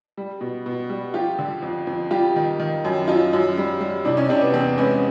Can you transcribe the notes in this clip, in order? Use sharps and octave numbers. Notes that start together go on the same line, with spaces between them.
G3
B2
B2
G3
F3 F4 G4
D3
F2
F2
G3 F4 G4
D#3
D#3
F#2
F#2 D#4 F4
F#2
G3
G3
C3 D4 E4
C#4 D#4
C3 C4 D4
B3
E2 C4
G#3 B3 C#4